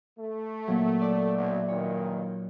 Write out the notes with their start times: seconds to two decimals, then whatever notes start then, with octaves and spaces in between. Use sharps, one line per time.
0.19 A3
0.67 A#2 F#3
1.01 D5 E5
1.35 B1
1.69 G2 A#2 D#3 C#5